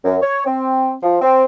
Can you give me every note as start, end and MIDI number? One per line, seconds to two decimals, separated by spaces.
0.04 0.17 42
0.22 0.43 73
0.45 0.92 60
1.03 1.17 53
1.22 1.44 60